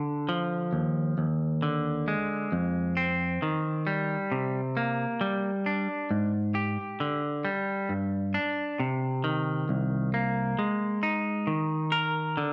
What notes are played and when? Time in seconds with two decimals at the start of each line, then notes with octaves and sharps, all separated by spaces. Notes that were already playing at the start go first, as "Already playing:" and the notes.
Already playing: D3
0.29 F3
0.73 D#2
1.18 D#2
1.62 D3
2.08 G#3
2.52 F2
2.97 C4
3.42 D#3
3.87 G3
4.32 C3
4.77 A#3
5.21 G3
5.66 D4
6.11 G#2
6.55 G4
7.00 D3
7.45 G3
7.89 G2
8.34 D4
8.80 C3
9.24 D#3
9.69 C2
10.14 A#3
10.59 G#3
11.03 D#4
11.47 D#3
11.92 A#4
12.37 D3